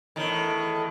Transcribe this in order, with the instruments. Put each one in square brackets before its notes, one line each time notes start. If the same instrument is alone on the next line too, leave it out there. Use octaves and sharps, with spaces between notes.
[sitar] E2 A2 D#3